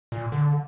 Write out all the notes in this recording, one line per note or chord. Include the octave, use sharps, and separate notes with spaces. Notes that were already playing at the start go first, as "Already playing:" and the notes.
A#2
D3